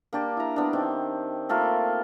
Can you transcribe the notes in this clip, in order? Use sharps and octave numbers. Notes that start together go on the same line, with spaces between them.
A#3 D4 G4 D5
E4 A#5
B3 D4
D#3 C4
A3 A#3 F4 A#4